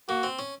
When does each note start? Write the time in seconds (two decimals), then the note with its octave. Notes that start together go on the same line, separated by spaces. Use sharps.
0.09 A#3 F#4
0.23 C4
0.39 C#4